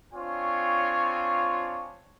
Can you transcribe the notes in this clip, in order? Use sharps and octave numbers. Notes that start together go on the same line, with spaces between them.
C4 D4 F4 C#5 G#5 C#6